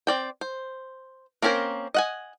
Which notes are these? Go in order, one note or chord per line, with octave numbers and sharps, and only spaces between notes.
C4 D5 G5
C5
A#3 C4 C#4 A#4 C5
D#5 F#5 G#5